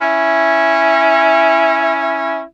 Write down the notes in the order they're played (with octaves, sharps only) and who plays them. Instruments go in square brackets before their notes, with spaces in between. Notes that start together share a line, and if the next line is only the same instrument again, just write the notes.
[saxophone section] C#4 E4